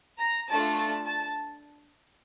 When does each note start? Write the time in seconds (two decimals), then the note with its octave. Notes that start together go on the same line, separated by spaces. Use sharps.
0.19 A#5
0.48 A3 D4 F4 A5
0.78 A5
1.07 A5